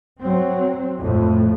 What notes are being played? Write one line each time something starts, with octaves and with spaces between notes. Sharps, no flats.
F#3 C4
F2 A2